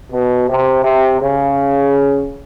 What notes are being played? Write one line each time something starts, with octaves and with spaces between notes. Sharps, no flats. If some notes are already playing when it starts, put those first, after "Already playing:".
B2
C3
C3
C#3